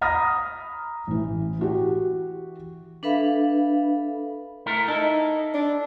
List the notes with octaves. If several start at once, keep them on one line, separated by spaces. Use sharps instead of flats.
A#5 B5 D#6 F6 A#6
A1 E3
E3 F#4 G4
D4 A4 B4 E5 F5 B5
A3 E4 A#4
D#4 E4 A4
D4